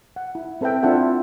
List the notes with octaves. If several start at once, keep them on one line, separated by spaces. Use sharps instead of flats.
F#5
E4
C4 A4 B4 E5 G5
C4 D4 E4 F4 A4 F#5